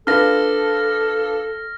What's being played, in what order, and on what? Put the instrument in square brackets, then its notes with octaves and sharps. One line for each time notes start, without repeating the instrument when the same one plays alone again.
[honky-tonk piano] D4 F4 B4 [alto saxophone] A4 [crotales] F6 A#6